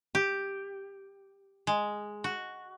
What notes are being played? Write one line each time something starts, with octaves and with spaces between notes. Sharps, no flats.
G4
G#3
F#4